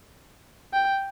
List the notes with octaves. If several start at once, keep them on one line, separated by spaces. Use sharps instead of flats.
G5